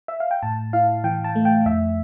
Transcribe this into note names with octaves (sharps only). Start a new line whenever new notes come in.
E5
F5
G5
A2 A5
E4 F5
E3 G5
A5
A3
G5
F2 E5